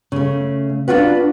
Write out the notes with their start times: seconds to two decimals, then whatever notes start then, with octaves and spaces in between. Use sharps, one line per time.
0.12 C#3 A3
0.88 D4 D#4 F4 F#4 B4